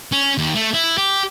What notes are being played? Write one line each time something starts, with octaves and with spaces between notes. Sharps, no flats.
C#4
D#2
A3
E4
G4